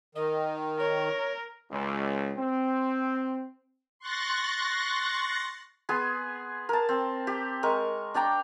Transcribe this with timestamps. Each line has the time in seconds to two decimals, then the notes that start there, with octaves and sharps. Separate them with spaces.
0.15 D#3 D#5
0.79 A#4 C#5
1.71 C#2
2.37 C4
3.99 C6 C#6 F#6 A6 A#6
5.89 B3 G#4 B4 C6
6.69 A#4 A5
6.89 C4
7.27 G4
7.63 G#3 A#4 C#6
8.14 D4 D5 G5 A#5